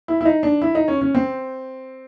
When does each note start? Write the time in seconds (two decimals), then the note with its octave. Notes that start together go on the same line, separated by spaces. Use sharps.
0.08 E4
0.21 E4
0.25 D#4
0.43 D4
0.62 E4
0.75 D#4
0.88 C#4
1.01 C#4
1.15 C4